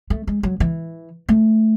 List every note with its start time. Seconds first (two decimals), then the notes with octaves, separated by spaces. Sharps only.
0.10 A3
0.27 G#3
0.43 F#3
0.60 E3
1.29 A3